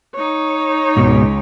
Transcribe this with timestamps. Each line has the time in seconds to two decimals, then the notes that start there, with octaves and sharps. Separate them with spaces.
0.15 D#4 C#5
0.97 C#2 G#2 B2